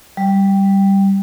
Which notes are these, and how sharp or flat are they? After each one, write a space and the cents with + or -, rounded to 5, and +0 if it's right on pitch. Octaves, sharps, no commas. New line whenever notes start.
G3 +0